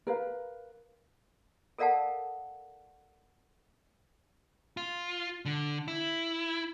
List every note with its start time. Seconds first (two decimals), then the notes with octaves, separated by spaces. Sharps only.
0.07 A#4 B4 F5
1.79 A4 A#4 D5 F5 F#5 A5
4.77 F4
5.45 D3
5.88 E4